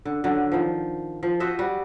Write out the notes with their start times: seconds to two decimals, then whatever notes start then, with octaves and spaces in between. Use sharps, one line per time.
0.05 D3
0.24 D3 F#3
0.52 D#3 F3
1.23 F3
1.40 F#4 C5 D#5 E5
1.59 G3 F#4